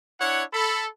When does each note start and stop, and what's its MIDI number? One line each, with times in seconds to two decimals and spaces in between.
0.20 0.43 62
0.20 0.43 64
0.20 0.43 73
0.20 0.43 78
0.53 0.86 69
0.53 0.86 83